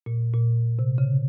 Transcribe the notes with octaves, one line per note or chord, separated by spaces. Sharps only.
A#2
A#2
C3
C#3